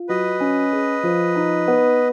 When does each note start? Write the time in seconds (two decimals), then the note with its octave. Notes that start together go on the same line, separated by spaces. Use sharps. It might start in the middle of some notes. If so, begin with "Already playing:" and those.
Already playing: F4
0.09 F#3 B4 D#5
0.40 C#4
0.73 G#4
1.03 F3
1.35 D#4
1.68 B3